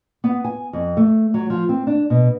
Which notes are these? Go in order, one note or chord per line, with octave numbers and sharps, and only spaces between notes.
B3
G#5
F2
A3
F#3
F3
C4
D4
B2